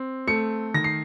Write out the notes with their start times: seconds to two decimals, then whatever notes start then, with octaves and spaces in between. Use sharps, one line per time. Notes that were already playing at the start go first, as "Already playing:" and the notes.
Already playing: C4
0.27 A3 C#7
0.74 D#3 A#6
0.84 C7